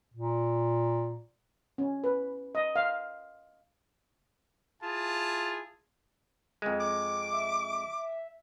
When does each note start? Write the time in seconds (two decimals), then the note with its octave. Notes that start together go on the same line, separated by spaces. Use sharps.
0.14 A#2
1.78 C#4
2.04 B4
2.55 D#5
2.76 F5
4.82 E4 F4 G#4 A5
6.62 F2 G#3
6.80 D6
7.33 E5